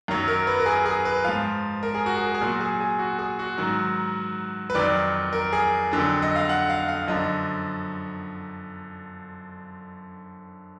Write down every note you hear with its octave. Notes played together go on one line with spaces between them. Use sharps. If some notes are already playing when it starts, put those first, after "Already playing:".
F#2 D#3 F#3
A#4
B4
A#4
G#4
G#4
B4
G#2 F3 F5
A#4
G#4
F#4
G#4
A#4
G#4
A#2 F#3 F#4
G#4
G#4
F#4
G#4
F#4
G#2 D#3 F#3
B4
F2 D#3 F#3 D5
A#4
G#4
F2 D3 F#3
D#5
F5
F#5
F5
F5
F#2 D3 F3 D#5